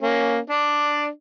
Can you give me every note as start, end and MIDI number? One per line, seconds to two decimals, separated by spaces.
0.02 0.39 58
0.02 0.39 61
0.50 1.08 62
0.50 1.08 74